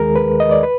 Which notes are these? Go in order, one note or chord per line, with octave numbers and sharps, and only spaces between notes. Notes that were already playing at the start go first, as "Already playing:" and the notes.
Already playing: D#2 D#3 G#3 G#4 A#4
B4
D#5
D5
B4